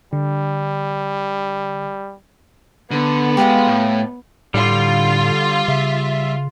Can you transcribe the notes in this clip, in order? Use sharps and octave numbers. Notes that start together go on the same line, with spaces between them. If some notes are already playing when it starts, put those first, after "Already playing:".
D3 G3
D3 B3
G#3 G4 A4 F5
A2
A2 D3 G3 F4
C#3 E5